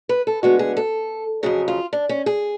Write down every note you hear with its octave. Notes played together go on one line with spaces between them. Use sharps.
B4
A4
D2 D3 G#3 B3 F#4
G#4
A4
F2 C#3 F#3 G#4
F4
D4
C#4
G#4